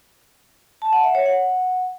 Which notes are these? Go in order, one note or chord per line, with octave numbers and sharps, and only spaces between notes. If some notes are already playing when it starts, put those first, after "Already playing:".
A5
F#5
E5
C#5
F#5